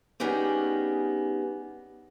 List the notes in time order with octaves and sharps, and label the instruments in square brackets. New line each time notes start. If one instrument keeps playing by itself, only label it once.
[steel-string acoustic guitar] G3 B3 C#4 D#4 G4 G#4